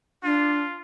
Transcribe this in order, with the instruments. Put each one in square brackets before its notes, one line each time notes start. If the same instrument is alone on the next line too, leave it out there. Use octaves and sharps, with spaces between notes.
[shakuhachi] D4 [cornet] F4